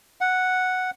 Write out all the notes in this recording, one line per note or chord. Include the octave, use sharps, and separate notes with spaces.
F#5